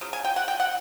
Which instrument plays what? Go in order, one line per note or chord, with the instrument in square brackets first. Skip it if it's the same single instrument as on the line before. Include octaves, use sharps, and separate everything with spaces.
[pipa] C#3 F#3
G#5
G5
F#5
G5
F#5